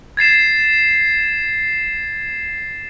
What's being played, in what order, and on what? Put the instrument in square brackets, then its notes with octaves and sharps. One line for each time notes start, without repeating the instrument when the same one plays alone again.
[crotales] G#6 A6 C7 E7